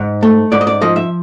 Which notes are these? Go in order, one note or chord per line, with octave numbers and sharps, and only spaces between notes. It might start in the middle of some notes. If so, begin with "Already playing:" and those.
Already playing: G#2
A3
G#2 D5
D#5
D5
F3 D#5
E5